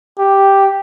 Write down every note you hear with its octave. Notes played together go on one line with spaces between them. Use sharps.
G4